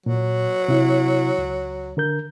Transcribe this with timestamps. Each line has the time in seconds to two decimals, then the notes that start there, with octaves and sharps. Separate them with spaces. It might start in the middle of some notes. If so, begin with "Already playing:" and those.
0.06 A#2 F#3
0.68 C3 E4
1.38 C#2
1.97 D3 A#4 G6